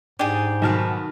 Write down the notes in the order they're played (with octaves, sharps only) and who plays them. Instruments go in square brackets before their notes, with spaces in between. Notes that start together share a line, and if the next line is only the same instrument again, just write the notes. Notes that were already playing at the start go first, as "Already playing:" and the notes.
[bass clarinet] G#2 [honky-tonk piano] D4 [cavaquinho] G4 G#4
[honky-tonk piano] B1 A5 F6 [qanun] D#3 F#4 B4